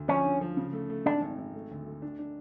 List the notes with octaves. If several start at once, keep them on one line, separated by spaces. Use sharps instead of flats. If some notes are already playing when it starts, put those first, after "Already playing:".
Already playing: D2
F3 C#4
D3
F3
C#3
A3
A3
G#1 D4
G#1
G#1
A3
D2
A3
D4
D4